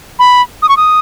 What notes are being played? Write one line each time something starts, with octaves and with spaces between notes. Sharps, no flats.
B5
D#6
C#6
D#6